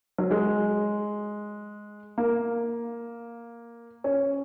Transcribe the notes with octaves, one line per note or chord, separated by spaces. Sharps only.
F#3
G#3
A#3
C#4